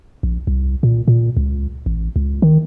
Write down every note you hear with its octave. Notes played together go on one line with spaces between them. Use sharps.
A#1
C2
A#2
A#2
C#2
A1
C#2
D#3